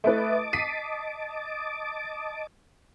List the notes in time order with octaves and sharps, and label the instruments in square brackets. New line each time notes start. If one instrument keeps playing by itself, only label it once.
[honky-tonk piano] A3 E4 B4 [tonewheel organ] D#5 A5 D6
[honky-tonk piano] B6 C7 D#7